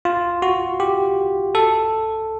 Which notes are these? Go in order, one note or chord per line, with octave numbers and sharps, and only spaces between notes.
F4
F#4
G4
A4